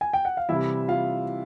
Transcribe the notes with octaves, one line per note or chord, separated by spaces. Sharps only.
G#5
G5
F#5
F5
C3 E3 G3 E4 E5
F4 F5